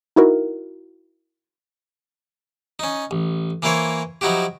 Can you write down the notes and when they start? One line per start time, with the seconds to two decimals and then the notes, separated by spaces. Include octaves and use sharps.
0.16 D#4 E4 F#4 A#4
2.79 C#4 D#4
3.11 A1
3.62 E3 A#3 E4 A#4 C5 C#5
4.21 F3 F#3 D#4 E4 F#4 G4